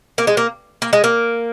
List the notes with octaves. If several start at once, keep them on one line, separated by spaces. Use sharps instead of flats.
A#3
G#3
A#3
A#3
G#3
A#3